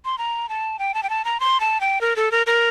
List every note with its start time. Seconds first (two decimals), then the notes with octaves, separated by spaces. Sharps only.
0.05 C6
0.18 A#5
0.49 A5
0.79 G5
0.94 A5
1.03 G5
1.10 A5
1.25 A#5
1.40 C6
1.60 A5
1.81 G5
2.01 A#4
2.16 A4
2.32 A#4
2.47 A#4